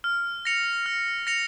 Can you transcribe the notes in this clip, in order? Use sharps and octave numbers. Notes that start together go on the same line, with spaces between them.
F6
A#6 C#7 F7
F6
A#6 C#7 F7